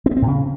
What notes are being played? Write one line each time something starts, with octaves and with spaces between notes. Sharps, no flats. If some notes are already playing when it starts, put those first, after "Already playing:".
C4
B3
C4
A2
C#3